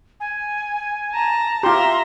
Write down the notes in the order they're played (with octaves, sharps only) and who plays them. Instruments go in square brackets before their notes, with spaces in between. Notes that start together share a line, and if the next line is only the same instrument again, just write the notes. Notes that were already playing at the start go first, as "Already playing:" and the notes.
[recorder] G#5
[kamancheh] A5 A#5
[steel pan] F4 G4 [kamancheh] E5 A#5 [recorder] C6